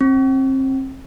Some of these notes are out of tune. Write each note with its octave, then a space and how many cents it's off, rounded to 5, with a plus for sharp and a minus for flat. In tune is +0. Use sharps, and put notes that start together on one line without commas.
C4 +30